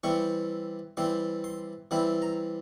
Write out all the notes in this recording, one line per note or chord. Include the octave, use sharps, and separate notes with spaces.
E3 G3 C4 E4 C#6
E3 G3 C4 E4 C6
C6
E3 G3 C4 E4 B5
A#5